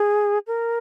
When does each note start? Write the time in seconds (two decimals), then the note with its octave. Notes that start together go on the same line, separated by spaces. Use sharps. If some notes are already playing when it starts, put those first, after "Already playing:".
Already playing: G#4
0.47 A#4